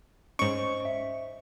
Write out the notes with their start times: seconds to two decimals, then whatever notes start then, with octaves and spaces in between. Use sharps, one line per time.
0.39 G#2 C#4 C5 D#5 C#6 D7
0.85 E5